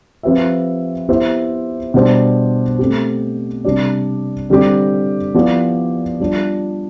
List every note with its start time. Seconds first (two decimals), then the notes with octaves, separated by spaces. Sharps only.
0.23 F3 C4 G4 B4 E5
1.08 B3 E4 G4 C5 E5
1.94 B2 G3 D4 G4 C5
2.79 A3 C4 G4
3.65 C3 G3 D4 G4 D5
4.50 D3 G3 C4 G4
5.34 F3 B3 E4 G4 D5
6.20 G3 D4 F4